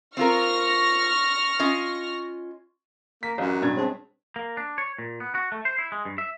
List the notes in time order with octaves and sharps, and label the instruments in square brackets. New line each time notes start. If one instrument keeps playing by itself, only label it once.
[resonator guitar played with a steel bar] C4 F4 A#4 [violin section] C#6 F6 A#6
[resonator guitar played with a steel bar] C#4 F4 D#5
[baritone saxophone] A#3 [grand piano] B6
[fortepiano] A1 [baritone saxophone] F#2
[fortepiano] G2 [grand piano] B2 G#6
[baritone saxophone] G#3 [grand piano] C4 C#5 A5
[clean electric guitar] A#3
D4
C#5
A#2
B3
F#4
A3
C5
E4
G#3
G2
E5